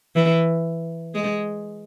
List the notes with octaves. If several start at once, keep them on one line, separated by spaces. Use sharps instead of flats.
E3
G#3